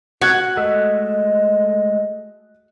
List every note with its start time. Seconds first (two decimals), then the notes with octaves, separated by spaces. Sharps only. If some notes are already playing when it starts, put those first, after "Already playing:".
0.22 F#4 F#6 G#6 C#7
0.57 G#3 A3 D#5 E5